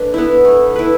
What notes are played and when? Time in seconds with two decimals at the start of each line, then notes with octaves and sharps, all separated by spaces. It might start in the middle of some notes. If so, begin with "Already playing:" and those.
Already playing: A3 D4 B4
0.14 B3 E4
0.45 A3
0.76 E4 B4